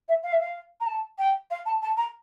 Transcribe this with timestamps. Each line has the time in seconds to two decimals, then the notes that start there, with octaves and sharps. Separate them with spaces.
0.08 E5
0.23 F5
0.32 E5
0.40 F5
0.80 A#5
0.86 A5
1.18 G5
1.50 F5
1.66 A5
1.82 A5
1.97 A#5